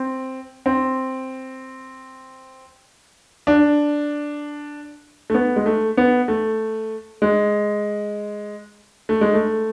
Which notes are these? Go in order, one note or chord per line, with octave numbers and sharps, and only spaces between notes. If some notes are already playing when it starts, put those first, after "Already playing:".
Already playing: C4
C4
D4
A3
B3
G#3
A3
B3
A3
G#3
A3
G#3
A3